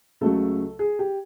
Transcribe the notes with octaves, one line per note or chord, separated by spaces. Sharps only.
C#2 C#3 F#3 A3 A4
G#4
G4